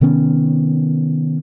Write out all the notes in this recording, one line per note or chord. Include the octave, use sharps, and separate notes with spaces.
C3 D#3 B3 C#4